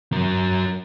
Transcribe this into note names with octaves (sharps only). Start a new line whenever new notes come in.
F#3 A#4